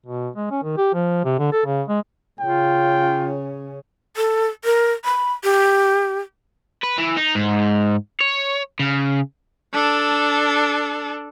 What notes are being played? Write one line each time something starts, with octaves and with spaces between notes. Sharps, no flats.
B2
G#3
C#4
D#3
G4
F3
C3
D3
A4
C#3
G#3
C#3 C#4 F4 G5
A4
A#4
B5
G4
B4
E3
D#4
G#2
C#5
C#3
D4 A4